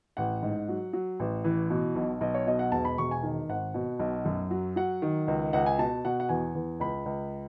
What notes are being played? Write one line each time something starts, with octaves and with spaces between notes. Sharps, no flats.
A1 F#5
G#2
F#3
F#3
A1
E3
B2
B1
B1 D#5
C#5
B2 D#5
F#5
E1 A5
B5
E1 C#6
G#5
D#3
G#1 F#5
B2
B1
F#2
F#3
F#3 F#5
D#3
C#2
C#2 F#5
G#5
B2 A5
B2 F#5
F#5
E2 G#5
E2
C#2 B5
C#2